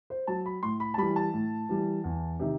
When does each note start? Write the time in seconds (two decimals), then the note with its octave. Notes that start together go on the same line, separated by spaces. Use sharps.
0.10 C5
0.27 F#3 A5
0.46 B5
0.62 A2 C6
0.80 B5
0.94 A5
0.98 E3 G3 B5
1.16 A5
1.33 A2
1.69 E3 G3
2.04 E2
2.40 C3 D#3